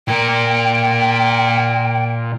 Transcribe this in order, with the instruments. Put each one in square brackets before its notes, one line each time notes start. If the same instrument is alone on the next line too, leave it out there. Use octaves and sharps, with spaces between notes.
[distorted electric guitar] A#2 A#4 [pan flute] G5